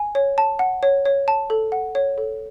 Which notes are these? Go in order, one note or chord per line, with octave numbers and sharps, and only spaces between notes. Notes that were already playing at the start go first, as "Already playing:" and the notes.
Already playing: G#5
C#5
A5
F#5
C#5
C#5
A5
A4
F#5
C#5
A4